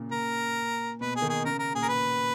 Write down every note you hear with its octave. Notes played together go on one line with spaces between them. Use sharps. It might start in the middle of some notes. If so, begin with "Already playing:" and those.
Already playing: A#2 C#3
A#2 A#4
B2 B4
G#4
D#3
G#4
C#3 A#4
A#4
A#2 G#4
A#4
B4